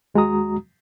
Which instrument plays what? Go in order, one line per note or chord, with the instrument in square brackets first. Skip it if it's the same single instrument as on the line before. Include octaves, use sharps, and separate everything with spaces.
[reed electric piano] D#2 G#3 F#4 A#5 D#6